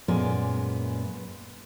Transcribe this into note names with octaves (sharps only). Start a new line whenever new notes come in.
F#2 A#2 G#3 B3 D5